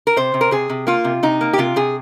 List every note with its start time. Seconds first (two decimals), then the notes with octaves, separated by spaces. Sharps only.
0.07 A#4
0.16 C3 C5
0.34 C3
0.41 A#4
0.51 C3 G#4
0.69 C3
0.87 A#3 F4
1.04 C3
1.23 C3 D#4
1.41 A#3
1.53 G4
1.58 C3 F4
1.76 C3 G#4